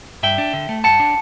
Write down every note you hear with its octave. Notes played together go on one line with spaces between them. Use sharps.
G2 E5 G5
D4
D3
A3
G2 F#5 A5
D4